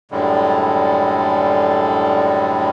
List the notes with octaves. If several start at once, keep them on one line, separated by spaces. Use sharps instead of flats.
F#2 A2 D3 G3 G#3